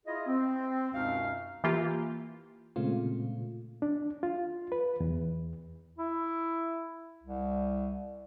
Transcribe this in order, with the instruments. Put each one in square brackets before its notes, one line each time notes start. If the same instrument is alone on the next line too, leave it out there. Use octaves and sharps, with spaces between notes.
[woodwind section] E4 F4 G#4 D#5
C4
C#2 F#2 B2 D#4 F5 F6
[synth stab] E3 A#3 F4 G4
[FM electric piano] A#2 C#3 G#3 A3 C4 F4
[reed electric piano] D4
F4
B4
E2
[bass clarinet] E4
C2